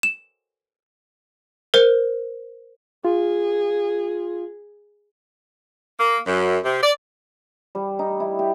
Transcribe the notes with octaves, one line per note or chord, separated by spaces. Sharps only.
E7
A#4 C5
F4 G#4
A#3
F#2
C3
D5
G3
D#4
E4
G4